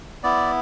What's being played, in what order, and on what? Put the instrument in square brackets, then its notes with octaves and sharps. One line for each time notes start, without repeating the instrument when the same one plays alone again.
[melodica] B3 E4 D5